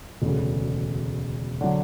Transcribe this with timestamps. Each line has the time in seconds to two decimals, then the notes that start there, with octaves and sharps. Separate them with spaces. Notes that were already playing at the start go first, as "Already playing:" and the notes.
0.22 E1 D2 C#3
1.61 D3 F#3